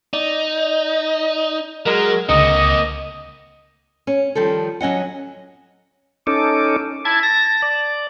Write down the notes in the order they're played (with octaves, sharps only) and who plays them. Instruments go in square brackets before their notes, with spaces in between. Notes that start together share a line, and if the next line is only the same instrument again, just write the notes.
[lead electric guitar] D#4 [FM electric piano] D5
[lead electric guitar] F#3 [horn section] G#3 A#4
[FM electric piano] C#2 D3 C#7 [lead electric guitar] A#3 C4 [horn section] D#5
[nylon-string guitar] C#4
D#3 F3 G3 A4
F#3 C#4 D#5 F#5
[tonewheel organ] C#4 D#4 A4 [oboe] D6
[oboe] E4 [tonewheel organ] A5 G#6
[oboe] A5 [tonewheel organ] A#6
[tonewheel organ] D5